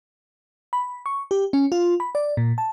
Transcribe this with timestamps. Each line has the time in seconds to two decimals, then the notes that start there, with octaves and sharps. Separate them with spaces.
0.73 B5
1.06 C#6
1.31 G4
1.53 C#4
1.72 F4
2.00 B5
2.15 D5
2.37 A#2
2.58 A5